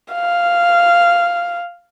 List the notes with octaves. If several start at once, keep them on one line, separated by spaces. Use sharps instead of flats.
F5